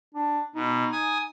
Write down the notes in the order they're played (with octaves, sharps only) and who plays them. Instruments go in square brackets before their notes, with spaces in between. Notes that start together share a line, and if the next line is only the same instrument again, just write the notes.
[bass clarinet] D4
[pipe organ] B2 [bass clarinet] D#4
[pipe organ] G#5 D#6